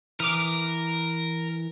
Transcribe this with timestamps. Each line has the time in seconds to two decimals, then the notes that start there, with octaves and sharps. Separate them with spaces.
0.20 E3 A#4 B4 D6 D#6 F6